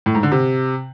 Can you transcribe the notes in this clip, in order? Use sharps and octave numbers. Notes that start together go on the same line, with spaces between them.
A2
G#2
D3
C3